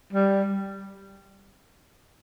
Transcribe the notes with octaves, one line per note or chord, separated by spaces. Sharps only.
G3